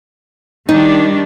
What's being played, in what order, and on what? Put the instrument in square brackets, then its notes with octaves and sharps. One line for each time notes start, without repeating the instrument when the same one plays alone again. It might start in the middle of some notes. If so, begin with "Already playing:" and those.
[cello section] D#3 G3 D4 [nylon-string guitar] D#4